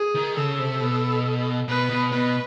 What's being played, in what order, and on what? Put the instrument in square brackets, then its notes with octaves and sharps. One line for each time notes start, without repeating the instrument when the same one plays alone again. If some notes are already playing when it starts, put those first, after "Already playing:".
Already playing: [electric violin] G#4
[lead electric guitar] D#3
[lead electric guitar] C#3 [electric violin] A4
[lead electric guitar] C3
B2
[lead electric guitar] B2 [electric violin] B4
[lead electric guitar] B2
[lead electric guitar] B2 [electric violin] B4